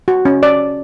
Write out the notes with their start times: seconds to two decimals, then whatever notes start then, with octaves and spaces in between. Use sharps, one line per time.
0.08 F#4
0.25 C#4
0.43 D5